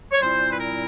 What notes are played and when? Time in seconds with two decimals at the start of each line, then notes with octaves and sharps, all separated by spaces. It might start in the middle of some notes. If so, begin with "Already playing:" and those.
0.12 C#5
0.21 A#2 G3 C4 E4 C5
0.51 B4
0.59 A#4